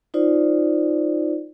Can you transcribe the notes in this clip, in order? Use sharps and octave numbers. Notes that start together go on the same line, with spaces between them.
D#4 F4 C5 D5